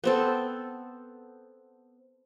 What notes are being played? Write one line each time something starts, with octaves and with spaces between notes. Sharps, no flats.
B3 C4 A4